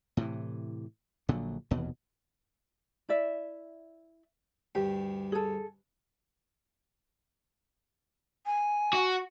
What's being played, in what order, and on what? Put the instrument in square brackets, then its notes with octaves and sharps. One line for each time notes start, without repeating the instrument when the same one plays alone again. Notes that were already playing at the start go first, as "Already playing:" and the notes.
[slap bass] A2 C3 E3
A#1 A#2 D3 F#3
F1 D#2 B2 E3
[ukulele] E4 D5 E5
[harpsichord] D2 G2 [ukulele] G4
[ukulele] G#4 A4
[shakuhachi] G#5
[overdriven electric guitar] F#4